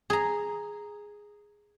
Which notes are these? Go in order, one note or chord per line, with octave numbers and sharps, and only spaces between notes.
G#4 A#5